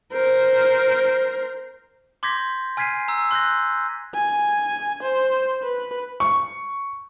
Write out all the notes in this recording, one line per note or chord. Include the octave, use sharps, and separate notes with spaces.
A#4 C5
C6 D6 G6 G#6 A#6 B6
G#5 F6 G#6 B6 C7 D#7
A#5 E6
C6 F#6 G6 A#6
G#5
C5
B4
C#6